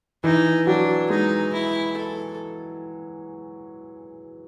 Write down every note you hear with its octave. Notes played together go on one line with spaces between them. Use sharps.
E3 D#4
F#3 D4
G#3 D#4
E4
A4